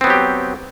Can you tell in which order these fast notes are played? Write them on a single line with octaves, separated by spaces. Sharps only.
C4 B3 F#3 G4